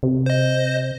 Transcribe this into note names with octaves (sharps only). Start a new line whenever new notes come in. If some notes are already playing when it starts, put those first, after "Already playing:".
C3
C5 D#5